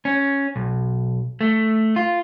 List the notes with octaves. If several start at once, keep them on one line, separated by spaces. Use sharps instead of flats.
C#4
B1
A3
F4